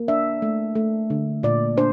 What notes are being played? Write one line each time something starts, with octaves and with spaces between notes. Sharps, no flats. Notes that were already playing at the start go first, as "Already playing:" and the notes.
Already playing: A#3
D4 E5
A3
A3
D3
A#2 D5
D4 C5